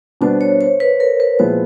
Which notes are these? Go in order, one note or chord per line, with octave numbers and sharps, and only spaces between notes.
B2 G3 B3 D4 C5
C#5
C5
B4
A#4
B4
A#2 F3 G#3 B3 E4 C5